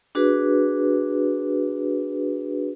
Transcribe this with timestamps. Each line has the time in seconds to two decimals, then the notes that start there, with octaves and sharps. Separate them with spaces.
0.15 D4 F#4 G#4 B4